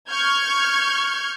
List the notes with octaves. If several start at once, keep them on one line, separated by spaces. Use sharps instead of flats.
C#6 F6 G6 G#6